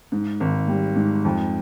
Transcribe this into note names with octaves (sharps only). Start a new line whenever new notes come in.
G#2
G#1
G3
G#2
F2